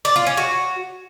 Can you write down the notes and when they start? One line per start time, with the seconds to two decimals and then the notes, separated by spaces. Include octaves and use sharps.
0.05 D5
0.16 F4
0.27 C#4
0.37 F#4